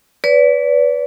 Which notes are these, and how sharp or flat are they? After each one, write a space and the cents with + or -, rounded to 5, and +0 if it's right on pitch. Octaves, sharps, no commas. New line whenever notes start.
B4 +0 D5 -35